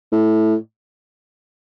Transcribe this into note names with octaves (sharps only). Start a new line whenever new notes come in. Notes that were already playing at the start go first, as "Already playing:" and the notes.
A2